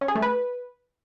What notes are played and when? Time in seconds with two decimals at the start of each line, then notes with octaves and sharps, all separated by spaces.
0.01 C#4
0.08 G#4
0.15 A3
0.22 B4